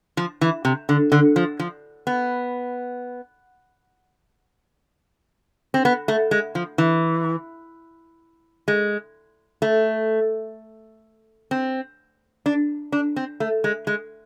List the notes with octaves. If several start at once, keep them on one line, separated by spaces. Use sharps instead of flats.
F3
E3
C3
D3
D3
F3
F3
B3
C4
B3
A3
G#3
F3
E3
G#3
A3
C4
D4
D4
C4
A3
G#3
G#3